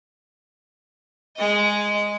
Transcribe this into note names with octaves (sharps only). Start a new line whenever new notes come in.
G#3 D#5